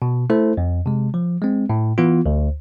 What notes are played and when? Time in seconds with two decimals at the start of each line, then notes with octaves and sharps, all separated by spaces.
0.02 B2
0.30 A3 E4 A4 C5
0.57 F2
0.86 C3 G#3
1.14 F3
1.42 G#3 C4
1.70 A2
1.98 E3 B3 F4
2.26 D2